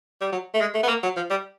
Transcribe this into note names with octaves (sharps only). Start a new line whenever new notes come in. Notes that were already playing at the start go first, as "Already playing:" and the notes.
G3
F#3
A3
G#3
A3
B3
A#3
F#3
F3
G3